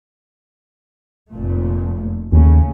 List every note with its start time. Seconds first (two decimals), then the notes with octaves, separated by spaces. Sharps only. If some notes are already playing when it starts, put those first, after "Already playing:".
1.31 F1 A#2 A3
2.32 D#2 C#3 A3 C#4